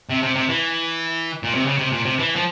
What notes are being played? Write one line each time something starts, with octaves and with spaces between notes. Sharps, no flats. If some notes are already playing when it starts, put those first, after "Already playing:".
C3
C3
C3
E3
A#2
C3
C#3
C3
A#2
C3
E3
F3